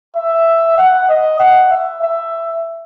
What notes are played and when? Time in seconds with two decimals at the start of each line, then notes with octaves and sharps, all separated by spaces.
0.16 E5
0.78 F#5
1.09 D#5
1.40 F#5
1.71 E5
2.02 E5